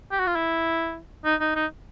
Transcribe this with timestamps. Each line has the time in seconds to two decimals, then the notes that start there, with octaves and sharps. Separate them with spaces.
0.12 G4
0.19 F#4
0.27 F4
0.36 E4
1.25 D#4
1.40 D#4
1.56 D#4